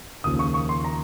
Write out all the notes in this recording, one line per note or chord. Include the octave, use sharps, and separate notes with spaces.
D#2 C#3 F3 D#6
C#6
C#6
C6
A#5